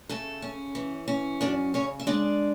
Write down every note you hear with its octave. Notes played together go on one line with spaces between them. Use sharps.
C#3 A3 A4
C#4
E3
C#4
F#2 D4 D5
C#3 C#4 C#5
E5
G#3 D4 D5